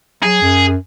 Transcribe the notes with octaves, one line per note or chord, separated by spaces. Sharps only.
F#3 G#4
F#2